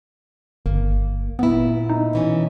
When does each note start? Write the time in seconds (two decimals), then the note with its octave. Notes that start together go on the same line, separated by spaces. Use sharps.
0.66 G1 A#3
1.39 A#2 B3 E4
1.89 D#4
2.13 B2 E3 C#4